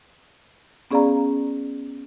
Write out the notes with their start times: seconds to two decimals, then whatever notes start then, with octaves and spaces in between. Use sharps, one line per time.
0.91 B3 C#4 G#4 D5 F5 A#5